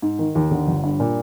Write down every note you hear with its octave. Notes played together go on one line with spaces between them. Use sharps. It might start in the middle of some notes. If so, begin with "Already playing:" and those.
G#2
D#3
D#2
D3
G1
G2
A#2